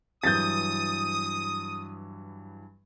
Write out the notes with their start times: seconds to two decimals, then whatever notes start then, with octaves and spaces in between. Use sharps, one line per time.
0.24 G2 E3 F#3 D#6 G6 A6